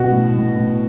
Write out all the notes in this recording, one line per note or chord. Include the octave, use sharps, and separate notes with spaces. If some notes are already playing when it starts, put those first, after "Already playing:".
Already playing: B2 F#4
A2
A2
A2